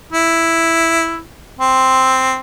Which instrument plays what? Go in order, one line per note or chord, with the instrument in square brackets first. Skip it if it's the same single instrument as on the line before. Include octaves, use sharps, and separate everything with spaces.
[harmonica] E4
C4